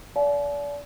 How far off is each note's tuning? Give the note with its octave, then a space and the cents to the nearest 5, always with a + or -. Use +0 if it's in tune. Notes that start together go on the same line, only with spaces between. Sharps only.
D5 -30 F5 +0 A5 -45